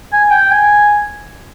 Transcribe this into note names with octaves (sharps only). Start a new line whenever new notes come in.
G#5
G5
G#5